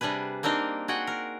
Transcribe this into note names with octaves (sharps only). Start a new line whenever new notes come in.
C3 G3 D4 G#4 B4
A#3 C4 D4 D#4 A#4
F#4 G#4 F#5 G5
A#4